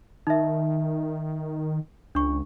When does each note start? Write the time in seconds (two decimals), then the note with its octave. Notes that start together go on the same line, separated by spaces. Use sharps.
0.27 D#3 D#4 E5
2.15 C#2 D4 C#6